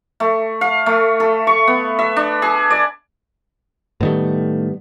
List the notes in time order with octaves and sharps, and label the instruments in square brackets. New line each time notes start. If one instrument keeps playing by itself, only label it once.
[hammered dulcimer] A3
F5
A3
A4
C#6
B3
E5
D4
G#4
D5
[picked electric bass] A2 D#3 A3 [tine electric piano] G3 B3